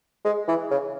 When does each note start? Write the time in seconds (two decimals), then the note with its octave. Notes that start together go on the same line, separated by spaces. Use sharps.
0.25 G#3
0.48 E3
0.71 C#3